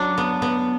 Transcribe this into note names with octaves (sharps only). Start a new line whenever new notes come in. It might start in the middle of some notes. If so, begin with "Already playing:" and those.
Already playing: F#3 D4
B3
B3